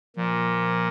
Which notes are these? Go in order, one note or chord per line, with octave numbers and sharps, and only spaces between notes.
A#2 F3